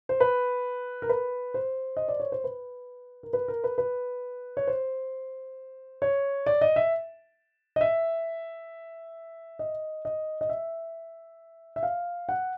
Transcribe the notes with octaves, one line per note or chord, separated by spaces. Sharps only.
C5
B4
A#4
B4
C5
D#5
D5
C#5
C5
B4
A#4
B4
A#4
B4
B4
C#5
C5
C#5
D5
D#5
E5
D#5
E5
D#5
D#5
D#5
E5
E5
F5
F#5